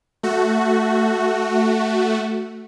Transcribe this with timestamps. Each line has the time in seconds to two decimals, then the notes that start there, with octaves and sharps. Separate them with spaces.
0.23 A3 F#4